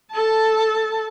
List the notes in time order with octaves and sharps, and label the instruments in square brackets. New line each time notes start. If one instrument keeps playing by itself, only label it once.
[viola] A4 A5